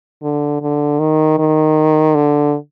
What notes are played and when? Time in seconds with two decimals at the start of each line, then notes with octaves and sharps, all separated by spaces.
0.23 D3
0.62 D3
0.99 D#3
1.38 D#3
2.15 D3